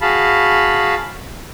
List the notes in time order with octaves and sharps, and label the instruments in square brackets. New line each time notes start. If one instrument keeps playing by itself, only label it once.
[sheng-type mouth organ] F#4 G#4 F5 A5 B5